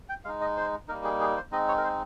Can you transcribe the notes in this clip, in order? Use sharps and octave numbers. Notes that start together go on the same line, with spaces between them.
G5
G#3 D#4 F5
D#5
C5
G3 A#3 D#4 A#4
G#4
G#4
C5
G#3 C4 D#4 D#5
C#5
A#4
C5